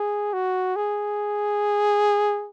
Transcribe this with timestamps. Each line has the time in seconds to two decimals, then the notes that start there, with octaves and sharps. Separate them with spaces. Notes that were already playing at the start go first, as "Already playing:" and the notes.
Already playing: G#4
0.33 F#4
0.76 G#4